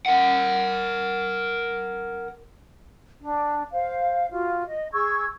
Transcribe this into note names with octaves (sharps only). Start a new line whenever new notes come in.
A#4 F#5
D4
C5 F5
F4 F#4
D#5
G#4 C#6 E6 G#6